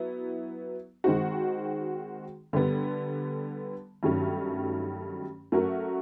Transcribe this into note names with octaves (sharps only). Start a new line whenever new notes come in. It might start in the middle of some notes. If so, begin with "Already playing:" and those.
Already playing: F#3 B3 E4
D#3 G#3 C4 D#4 F#4
D3 G3 B3
G2 D#3 F#3 A3 C#4
F#3 A3 C#4 F#4 A#4